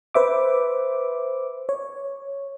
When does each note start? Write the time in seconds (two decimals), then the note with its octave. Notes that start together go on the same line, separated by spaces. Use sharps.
0.14 B4 C5 E5 D6
1.69 C#5